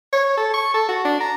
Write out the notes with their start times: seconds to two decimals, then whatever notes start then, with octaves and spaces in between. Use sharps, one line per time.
0.13 C#5
0.37 A4
0.54 C#6
0.74 A4
0.89 F#4
1.05 D4
1.20 A#5